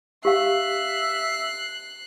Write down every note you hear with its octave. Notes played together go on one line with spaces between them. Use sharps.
G4 E5 F5 F#6 C7